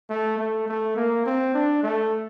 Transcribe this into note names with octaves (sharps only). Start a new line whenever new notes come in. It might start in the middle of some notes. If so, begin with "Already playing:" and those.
A3
A3
A3
A#3
C4
D4
A3